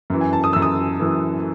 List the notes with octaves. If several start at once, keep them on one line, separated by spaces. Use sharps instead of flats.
F#2 E3
G#5
A5
D#6
F#2 E3 E6
D#6
F#2 E3